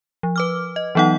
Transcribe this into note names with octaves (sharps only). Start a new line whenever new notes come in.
F3
B4 D6 F6
D#5
E3 F#3 B3 D#4 F#5